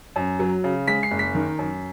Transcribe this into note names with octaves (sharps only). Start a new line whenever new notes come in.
F#2
F#3
C#3
G#3 B6
C7
F#1
B6
D#3
F#2